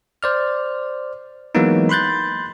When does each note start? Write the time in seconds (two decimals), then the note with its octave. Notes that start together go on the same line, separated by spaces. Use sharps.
0.23 C5 D5 F6
1.55 E3 F#3 G#3 A#3 B3 D#4
1.89 B5 C6 F#6 G6 A6